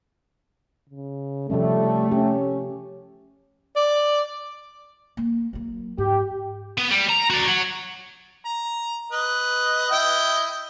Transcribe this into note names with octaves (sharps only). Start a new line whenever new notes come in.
C#3
C3 F3 G3 A3 C#4
C#4 G4
D5
A#3
F#3 A#3
G#2 G4
B3
G3
A#5
F#4 D5
C#5 F#5
A#5
B4 D#5
E4 D#5 G5